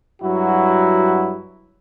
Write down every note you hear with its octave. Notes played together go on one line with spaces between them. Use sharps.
G2 F#3 E4 F#4